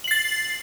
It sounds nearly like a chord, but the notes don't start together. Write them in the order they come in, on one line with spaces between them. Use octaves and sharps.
F#7 C7 A6